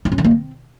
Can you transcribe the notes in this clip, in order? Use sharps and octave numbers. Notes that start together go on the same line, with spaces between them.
D#4
C#4
D#3
A#3
C4